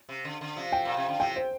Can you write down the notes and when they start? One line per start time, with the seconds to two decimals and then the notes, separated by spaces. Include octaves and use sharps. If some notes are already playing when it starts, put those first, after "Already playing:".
0.09 C3
0.25 D3
0.41 D3
0.56 C3 F3
0.72 G5
0.85 A#2
0.97 C3
1.08 D3
1.20 C3 F3 G5
1.36 C5